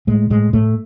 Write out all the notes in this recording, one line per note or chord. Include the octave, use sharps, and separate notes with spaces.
A2 G#3
A2 G#3
A2 A3